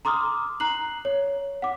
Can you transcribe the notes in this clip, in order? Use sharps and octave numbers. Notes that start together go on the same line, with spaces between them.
A#5 C6 D6 D#6 F6
A#5 F#6 C7 F#7
C#5
F#5 D6